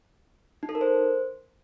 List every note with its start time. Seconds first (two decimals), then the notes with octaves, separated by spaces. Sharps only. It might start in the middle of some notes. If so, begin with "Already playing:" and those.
0.63 D#4
0.69 A4
0.75 A#4
0.81 C5